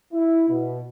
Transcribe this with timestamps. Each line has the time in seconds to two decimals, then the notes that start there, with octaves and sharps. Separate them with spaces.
0.13 E4
0.49 B2